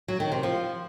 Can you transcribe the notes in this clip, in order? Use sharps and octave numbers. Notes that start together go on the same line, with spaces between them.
F#3
D#3
C3
F3